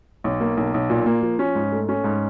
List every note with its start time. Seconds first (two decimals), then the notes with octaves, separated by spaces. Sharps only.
0.24 B1
0.41 A#3
0.57 B1
0.74 B1
0.90 A#2
1.06 A#3
1.22 F3
1.39 C#4
1.55 G#2
1.72 A3
1.89 C#4
2.04 G#2